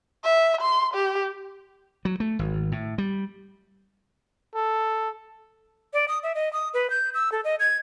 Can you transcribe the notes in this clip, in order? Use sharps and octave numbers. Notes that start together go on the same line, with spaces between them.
E5
C6
G4
F#3
A3
G#1
A2
G3
A4
D5
D#6
E5
D#5
D#6
B4
G6
E6
A4
D#5
G#6